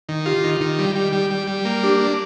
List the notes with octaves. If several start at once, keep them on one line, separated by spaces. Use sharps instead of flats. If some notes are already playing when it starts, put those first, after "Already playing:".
D#3
F4 G4
D#3
D#3
G3
G3
G3
G3
G3
A#3
D4 G4
D4